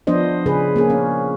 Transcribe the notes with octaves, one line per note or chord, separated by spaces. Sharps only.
F3 B3 D4 C5 D#5
C#3 G#4 B4
A#3 C#4 G#4
C#4